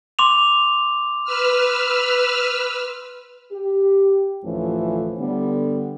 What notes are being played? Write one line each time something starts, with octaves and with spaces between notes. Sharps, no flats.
C6 D6 F7
B4 E6 F6
G4
D2 A2 E3 F3 A3 C#4
D3 G3 B3